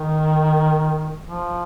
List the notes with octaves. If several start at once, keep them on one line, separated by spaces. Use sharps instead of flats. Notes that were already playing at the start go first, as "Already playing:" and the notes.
Already playing: D#3
F3